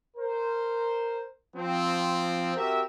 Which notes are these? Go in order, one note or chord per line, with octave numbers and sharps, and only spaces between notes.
A#4 C5
F3 C4
C4 F#4 G4 A#4 E5